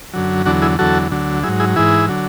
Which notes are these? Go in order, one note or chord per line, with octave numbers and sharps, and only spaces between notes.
F#2 D3 F#3
E2 D3 F#3 D4 F#4
E4 G#4
E2 D3 F#3 F#4 A4
D2 D3 F#3
G#2 F#3 E4 G#4
E4 G#4
G#2 E3 E4 G#4
D3 F#3